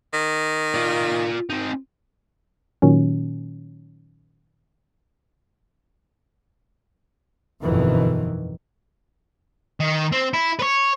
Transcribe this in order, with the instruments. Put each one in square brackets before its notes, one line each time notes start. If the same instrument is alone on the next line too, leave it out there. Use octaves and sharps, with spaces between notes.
[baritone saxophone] D#3
[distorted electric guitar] F4 D5
C4 D#4
[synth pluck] A#2 D#3 F#3 C#4
[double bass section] G1 F2 B2 D#3 E3
[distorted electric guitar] D#3
C4
E4
B4 C#5